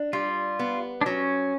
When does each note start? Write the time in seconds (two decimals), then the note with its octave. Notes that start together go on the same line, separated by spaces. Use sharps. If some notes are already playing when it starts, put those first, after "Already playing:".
Already playing: D4
0.13 G3 F4
0.59 B3
1.01 D4
1.06 F#3 C#4